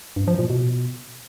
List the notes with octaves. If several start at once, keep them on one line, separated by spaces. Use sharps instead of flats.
G2
F3
A#2
B2